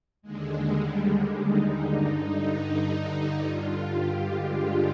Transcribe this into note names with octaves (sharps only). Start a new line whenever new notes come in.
D#2 D3 G#3
G3
G#3
D#4
G2 D3
G2 D3 F4
G4
G#3